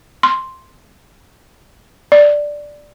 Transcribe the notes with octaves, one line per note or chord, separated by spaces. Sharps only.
C6
D5